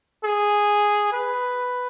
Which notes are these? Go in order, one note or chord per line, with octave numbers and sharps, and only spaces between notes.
G#4
B4